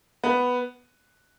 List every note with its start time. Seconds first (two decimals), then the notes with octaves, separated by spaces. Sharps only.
0.24 B3